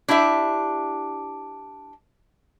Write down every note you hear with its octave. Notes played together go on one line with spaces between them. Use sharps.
D4 E4 G4 E5